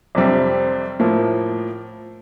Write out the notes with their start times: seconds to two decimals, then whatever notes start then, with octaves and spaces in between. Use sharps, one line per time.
0.15 F2 C3 G3 C4
0.99 A2 F3 A#3